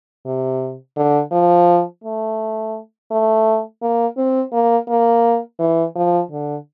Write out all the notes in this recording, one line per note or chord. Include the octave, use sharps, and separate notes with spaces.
C3
D3
F3
A3
A3
A#3
C4
A#3
A#3
E3
F3
D3